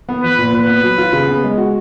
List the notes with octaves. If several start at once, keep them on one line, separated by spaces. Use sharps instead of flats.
B3
F3 B4
A#2
A#2 B4
B3
F#3
F4
C#3
B3
G#3
F#4